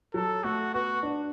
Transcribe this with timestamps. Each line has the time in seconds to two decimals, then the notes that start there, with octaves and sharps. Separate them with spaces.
0.14 F#3 A4
0.44 A3 F#4
0.74 B3 F#4
1.03 D4